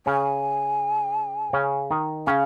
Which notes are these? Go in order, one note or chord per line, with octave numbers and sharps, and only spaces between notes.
C#3 C#4 G#5
C#3 C#4
D#3 D#4
C#3 C#4 F5 G#5